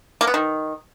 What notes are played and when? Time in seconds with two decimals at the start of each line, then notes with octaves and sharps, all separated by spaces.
0.21 A#3
0.27 B3
0.34 D#3